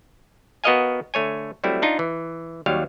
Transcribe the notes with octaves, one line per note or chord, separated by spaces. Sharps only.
B3 F#4 A#4 D#5 F5 G#5
D3 A3 C#5 G#5
F#3 G3 A3 C4 E4
D4 D#4 F4
E3
D#2 F#3 G3 F5